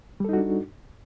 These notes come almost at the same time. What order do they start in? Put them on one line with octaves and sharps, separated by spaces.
G3 A4 D#4 F#4 D4